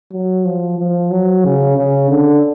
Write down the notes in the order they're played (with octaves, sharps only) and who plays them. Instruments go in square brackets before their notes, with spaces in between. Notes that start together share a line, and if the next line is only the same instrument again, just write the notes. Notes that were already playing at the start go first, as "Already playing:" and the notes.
[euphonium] F#3
F3
F3
F#3
C#3
C#3
D3